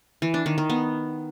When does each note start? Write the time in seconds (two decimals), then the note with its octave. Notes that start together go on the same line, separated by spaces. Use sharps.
0.22 E3
0.34 D4
0.46 D#3
0.58 D#3
0.70 B3